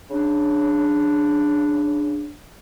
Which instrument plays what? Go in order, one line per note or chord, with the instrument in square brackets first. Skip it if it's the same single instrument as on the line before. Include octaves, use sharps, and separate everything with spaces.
[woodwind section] C#3 D4